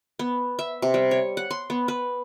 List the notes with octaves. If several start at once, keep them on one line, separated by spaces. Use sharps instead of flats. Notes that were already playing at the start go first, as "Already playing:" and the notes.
B3
E5
C3
G3
C#5
F#5
C6
B3
B4